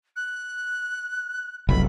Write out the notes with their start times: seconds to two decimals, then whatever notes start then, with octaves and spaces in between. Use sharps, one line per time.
0.16 F#6
1.69 F1 B1 B5